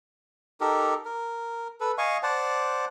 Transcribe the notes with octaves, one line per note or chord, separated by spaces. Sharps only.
D#4 G4 A4 A#4
A#4
A4 B4
D#5 F5 G#5 C#6
C5 D5 F#5 A5